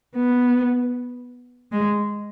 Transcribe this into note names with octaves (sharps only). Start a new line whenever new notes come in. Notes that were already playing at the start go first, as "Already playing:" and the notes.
B3
G#3